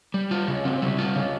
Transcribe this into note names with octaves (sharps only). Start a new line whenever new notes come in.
G3
F4
C#3
C4
G3
F4
C#3